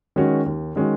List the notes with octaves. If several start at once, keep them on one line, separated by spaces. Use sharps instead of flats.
D#3 G#3 C#4 F#4
D#2
D#3 G#3 C#4 F#4